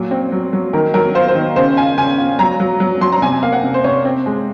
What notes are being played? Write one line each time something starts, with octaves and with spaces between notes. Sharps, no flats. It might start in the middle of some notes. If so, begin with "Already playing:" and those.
Already playing: A#2 F#3
C4
F#3
F#3
D#3 A#4
F#3 A#4
F4 C5
C5
D#3
C#3 C5
F4 G#5
C#3 G#5
F4
F#3 A#5
F#3
F#3
F#3 C6
A#5
C3 G#5
G#5
A#3 F5
F#5
C3
C5
C3 C#5
C4
G#3